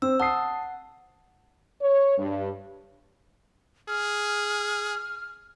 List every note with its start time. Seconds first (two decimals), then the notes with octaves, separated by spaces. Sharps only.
0.02 C4 E6
0.20 F#5 A5 D#6 C7
1.80 C#5
2.18 G2
3.89 G#4 F6